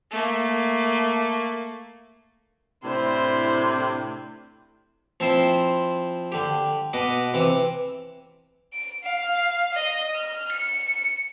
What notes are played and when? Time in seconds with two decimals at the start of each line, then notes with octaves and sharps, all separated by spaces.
0.11 A3 A#3
2.84 A2 C3 D4 E4 C5
5.20 F3 C4 E4 C5 C6
6.32 D3 G4
6.93 B2 B4 D#5 B5 D6
7.34 C3 E3 D6
8.73 D7
9.04 F5
9.74 D#5
10.16 F6
10.52 C#7